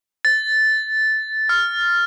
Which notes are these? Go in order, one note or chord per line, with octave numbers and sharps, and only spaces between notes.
A6
F6